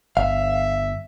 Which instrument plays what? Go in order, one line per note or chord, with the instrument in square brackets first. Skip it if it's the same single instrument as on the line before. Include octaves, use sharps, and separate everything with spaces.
[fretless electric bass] G1 [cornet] E5 [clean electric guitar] F5